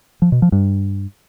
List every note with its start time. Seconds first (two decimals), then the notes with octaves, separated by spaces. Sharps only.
0.22 F3
0.32 B2
0.42 F3
0.52 G2